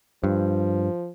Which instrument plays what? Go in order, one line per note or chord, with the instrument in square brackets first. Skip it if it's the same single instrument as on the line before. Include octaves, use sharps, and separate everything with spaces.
[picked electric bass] G2 [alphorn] F3